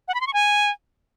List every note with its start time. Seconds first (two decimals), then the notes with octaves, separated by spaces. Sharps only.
0.08 F#5
0.14 B5
0.21 C6
0.27 C#6
0.33 G#5